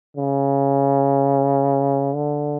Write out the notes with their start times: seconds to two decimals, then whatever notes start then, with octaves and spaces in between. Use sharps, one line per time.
0.17 C#3
2.15 D3